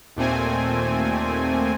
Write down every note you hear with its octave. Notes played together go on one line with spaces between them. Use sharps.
D#2 A#2 A3 C4 G#5